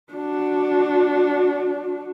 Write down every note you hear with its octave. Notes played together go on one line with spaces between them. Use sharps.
D4 F#4